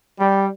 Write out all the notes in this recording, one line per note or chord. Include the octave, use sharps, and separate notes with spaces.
G3